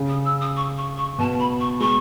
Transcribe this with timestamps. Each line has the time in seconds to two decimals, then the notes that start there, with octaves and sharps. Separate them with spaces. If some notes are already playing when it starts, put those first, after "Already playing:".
Already playing: C#3
0.09 D#6
0.25 E6
0.41 D#6
0.56 C#6
0.77 C#6
0.97 C#6
1.19 B2 A5
1.39 B5
1.60 C#6
1.80 G#3 C#6